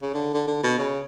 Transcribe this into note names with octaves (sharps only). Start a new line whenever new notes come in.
C#3
D3
D3
D3
B2
C#3